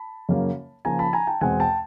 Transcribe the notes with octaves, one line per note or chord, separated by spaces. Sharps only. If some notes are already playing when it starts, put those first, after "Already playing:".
Already playing: A5 B5
F#2 C#3 F#3 A#3
C#3 F3 A#3 G#5 A#5
A5 B5
G#5 A#5
G5 A5
E2 B2 G#3 C4 F#5 G#5
G5 A5